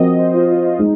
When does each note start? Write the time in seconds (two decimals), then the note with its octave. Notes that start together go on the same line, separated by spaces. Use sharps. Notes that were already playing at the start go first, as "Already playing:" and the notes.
Already playing: F3 C4 F#4 A#4 D#5
0.19 C5
0.33 F4
0.49 F4
0.64 F4
0.79 G#3 D#4